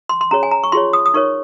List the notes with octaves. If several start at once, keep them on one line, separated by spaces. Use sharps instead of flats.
C6
C6
C#4 G#4 C#5 A#5
G#5
A#5
C#6
F4 G#4 C#5 C6
D#6
D#6
D#4 A#4 C#5 C#6